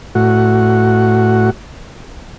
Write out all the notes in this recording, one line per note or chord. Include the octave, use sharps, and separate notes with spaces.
A2 F#4